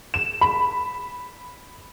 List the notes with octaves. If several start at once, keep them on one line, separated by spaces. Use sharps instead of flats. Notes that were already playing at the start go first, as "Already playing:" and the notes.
E7
B5